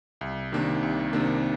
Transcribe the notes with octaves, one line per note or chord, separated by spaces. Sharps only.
C2
C3 D#3 A#3 D4
C2
C3 D#3 A#3 D4